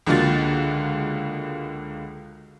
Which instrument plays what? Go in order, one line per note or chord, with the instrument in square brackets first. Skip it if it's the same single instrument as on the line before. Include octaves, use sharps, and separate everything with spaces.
[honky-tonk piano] C#2 D3 A#3 F4 F#4 A6